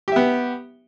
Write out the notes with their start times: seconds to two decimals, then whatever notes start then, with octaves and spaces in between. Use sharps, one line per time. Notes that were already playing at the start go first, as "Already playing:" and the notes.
0.08 G4
0.12 E5
0.16 B3